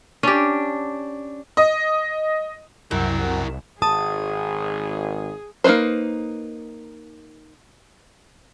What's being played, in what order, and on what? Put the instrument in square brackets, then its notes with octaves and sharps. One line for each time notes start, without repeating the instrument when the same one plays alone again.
[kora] C#4 G4 [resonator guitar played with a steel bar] D4
[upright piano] D#5
[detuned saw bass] C2 [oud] F#2 [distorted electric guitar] E4 A#4
[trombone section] G#1 [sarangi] G#4 [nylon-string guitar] A5 [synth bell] D#6
[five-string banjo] A#3 D#4 F4 B4 C5